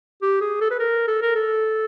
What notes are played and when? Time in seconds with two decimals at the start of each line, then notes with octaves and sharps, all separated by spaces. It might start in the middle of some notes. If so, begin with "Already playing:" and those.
0.22 G4
0.41 G#4
0.61 A4
0.71 B4
0.80 A#4
1.08 A4
1.22 A#4
1.36 A4